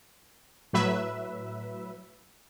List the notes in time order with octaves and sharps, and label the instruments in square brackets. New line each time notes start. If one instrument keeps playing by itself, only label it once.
[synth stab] A2 F#3 B4 E5